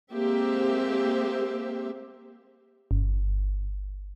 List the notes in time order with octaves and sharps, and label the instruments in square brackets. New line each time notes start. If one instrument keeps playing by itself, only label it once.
[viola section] G#3 A#3 C4 G4 C5 E5
[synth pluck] G1